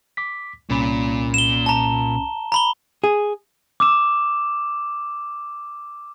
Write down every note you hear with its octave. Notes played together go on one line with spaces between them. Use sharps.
D6 B6
C2 A#2 C#4 B5
E7 G7
A5 A#5
A#5 B5 G7
G#4
D6 E6 E7